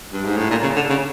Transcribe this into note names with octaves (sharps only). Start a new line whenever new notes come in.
G2
G#2
A2
A#2
C#3
D3
C#3